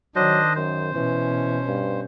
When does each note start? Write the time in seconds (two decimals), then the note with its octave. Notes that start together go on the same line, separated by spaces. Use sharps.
0.16 D#3 F#3 D4 C5 D#5
0.56 F#2 C5
0.94 B2 E3 C#4
1.66 G2